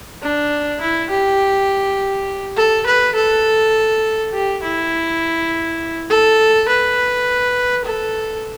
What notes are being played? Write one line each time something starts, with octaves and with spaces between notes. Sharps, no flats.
D4
E4
G4
A4
B4
A4
G4
E4
A4
B4
A4